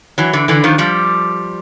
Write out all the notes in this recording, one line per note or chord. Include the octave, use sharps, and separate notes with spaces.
E3 F#3
D3 E3
D3 E3
D#3 F3
F3 G3